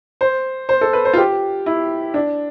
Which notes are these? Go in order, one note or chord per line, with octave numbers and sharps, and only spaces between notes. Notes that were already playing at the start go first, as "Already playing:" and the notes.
C5
C5
A4
B4
C5
F4
G4
E4
D4